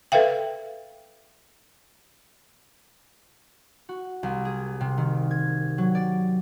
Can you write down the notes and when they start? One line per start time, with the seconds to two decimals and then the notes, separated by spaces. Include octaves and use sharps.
0.12 A4 B4 E5 F5 G5
3.89 F#4
4.23 C2
4.45 G#4
4.81 C3
4.97 D#3
5.31 G#6
5.78 F#3
5.95 D5